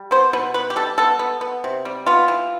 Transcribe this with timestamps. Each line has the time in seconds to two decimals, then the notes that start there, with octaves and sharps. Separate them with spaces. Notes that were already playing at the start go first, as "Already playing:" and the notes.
Already playing: G3
0.11 B3 C5
0.33 B2 B4
0.54 B3 B4
0.70 G4
0.76 G3 A4
0.98 B3 A4
1.19 B3
1.41 B3
1.64 C3
1.85 G3
2.06 B3 F4
2.28 E3